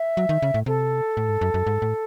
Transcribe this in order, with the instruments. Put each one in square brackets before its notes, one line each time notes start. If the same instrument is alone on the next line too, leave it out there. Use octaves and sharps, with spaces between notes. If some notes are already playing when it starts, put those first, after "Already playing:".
Already playing: [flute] E5
[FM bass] F#3
D#3
C#3
A2
[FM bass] C3 [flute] A4
[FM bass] A2
G#2
F#2
F#2
G#2
A2